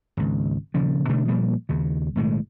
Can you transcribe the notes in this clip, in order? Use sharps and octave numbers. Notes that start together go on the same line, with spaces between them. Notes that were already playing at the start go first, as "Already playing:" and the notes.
G#1 C#2
D#1 C#3 F3
B2 D3 A3 D4
A#2 F3 G3 A#3
D#2 C#3
B1 A2 D#3 G#3